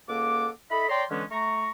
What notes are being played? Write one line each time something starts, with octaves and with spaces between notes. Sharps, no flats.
C#2 A#3 A4 F#5 D6
E4 A4 D#5 B5
C#5 D5 G5 A#5 C6
D3 E3 G#3 B3 C#4
A3 A#5 C#6